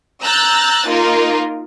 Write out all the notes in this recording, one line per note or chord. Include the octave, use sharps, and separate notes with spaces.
A#5 E6 F#6 G6 A6
A#3 D#4 F4 A#4